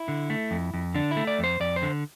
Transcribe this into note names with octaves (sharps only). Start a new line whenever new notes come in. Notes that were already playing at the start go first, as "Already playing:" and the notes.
Already playing: E4
D3
A3
F2
F2
D3 D4
E4
A3
D5
F2 C5
F2 D5
C5
D3